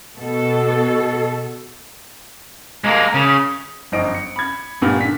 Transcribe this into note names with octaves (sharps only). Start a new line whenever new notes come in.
B2 A4
G#3 A#3
C#3
G1 F#2 F3 D#5 D7
C#7
B5 G#6
G1 G2 A#2 B3 F6
D3 B6